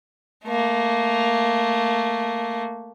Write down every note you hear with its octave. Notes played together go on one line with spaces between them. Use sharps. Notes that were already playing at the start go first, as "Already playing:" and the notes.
A3 A#3